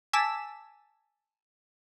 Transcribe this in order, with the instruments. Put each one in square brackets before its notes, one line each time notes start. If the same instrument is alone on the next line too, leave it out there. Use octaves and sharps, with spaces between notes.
[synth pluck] G#5 A5 D6 E6 B6 E7